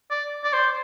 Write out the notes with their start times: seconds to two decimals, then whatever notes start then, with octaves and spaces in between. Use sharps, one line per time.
0.10 D5
0.44 D5
0.53 C5